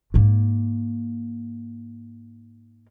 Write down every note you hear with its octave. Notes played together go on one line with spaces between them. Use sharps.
G#2 A#3